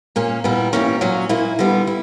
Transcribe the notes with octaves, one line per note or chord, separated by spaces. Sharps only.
A#2 A#3 C#4
A#2 G3 B3 E4
E3 G3 A#3 C#4
A#2 F#3 C#4
A#2 A#3 E4
D3 G3 B3
E4